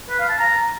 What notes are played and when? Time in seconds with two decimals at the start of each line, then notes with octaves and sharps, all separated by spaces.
0.10 B4
0.20 F5
0.29 A5
0.39 A#5